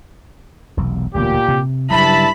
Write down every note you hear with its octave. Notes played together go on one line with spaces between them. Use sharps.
E1 B1 C3
E1 D2 A#2 B3 G4
C3
G2 C#3 F#3 E4 A5 B5